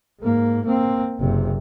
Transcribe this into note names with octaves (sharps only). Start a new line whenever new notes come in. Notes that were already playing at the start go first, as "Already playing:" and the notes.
G#2 A#3
A#3 C4
F#1 C3